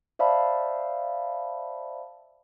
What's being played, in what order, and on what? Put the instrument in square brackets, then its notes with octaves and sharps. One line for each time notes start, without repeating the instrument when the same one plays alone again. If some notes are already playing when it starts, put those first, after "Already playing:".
[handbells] C5 D5 E5 F5 A5 B5